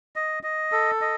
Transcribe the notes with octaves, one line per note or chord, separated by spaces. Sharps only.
D#5
D#5
A4
D#5